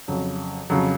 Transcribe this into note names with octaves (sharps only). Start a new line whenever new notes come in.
F2 C#3 F#3
F2 C#3 F#3